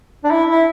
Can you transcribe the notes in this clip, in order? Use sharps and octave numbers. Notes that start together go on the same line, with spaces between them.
D4
E4
E4